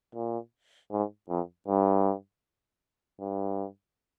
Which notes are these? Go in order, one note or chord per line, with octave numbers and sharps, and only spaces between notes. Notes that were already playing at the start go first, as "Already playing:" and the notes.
A#2
G#2
F2
G2
G2